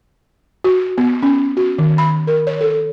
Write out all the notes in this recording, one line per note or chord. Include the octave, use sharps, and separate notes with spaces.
F#4
B3
C#4
F#4
D#3
B5
A#4
C#5
A4